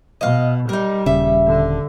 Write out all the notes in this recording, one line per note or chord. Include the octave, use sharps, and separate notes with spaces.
B2 D#5 F5
G3 D#4 A#4
D#1 C#3 E5
D3